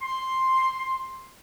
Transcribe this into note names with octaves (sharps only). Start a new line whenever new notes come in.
C6